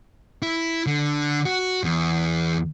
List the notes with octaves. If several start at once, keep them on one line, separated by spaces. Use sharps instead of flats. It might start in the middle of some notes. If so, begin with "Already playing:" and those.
E4
D3
F#4
E2